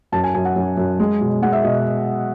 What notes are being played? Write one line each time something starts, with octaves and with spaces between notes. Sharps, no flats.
F#2 A5
G#5
F#2 G#5
F#5
F#2
F#2
G#3
B2
G#3 F#5
E5
B2 D#5